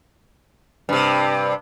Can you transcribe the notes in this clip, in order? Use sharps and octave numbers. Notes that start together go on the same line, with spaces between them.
G2 C3